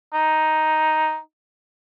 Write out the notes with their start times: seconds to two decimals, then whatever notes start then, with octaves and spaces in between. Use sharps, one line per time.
0.14 D#4